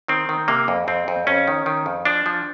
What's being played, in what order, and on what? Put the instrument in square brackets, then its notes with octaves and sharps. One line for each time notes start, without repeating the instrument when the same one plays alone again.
[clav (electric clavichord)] D#3 C4
D#3
C3 A#3
F2
F2 C4
F2
F2 C#4
D#3
D#3
F2
F3 D4
F3